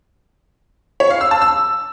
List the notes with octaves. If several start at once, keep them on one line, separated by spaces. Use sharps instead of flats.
C#5
F5
E6
A5
E6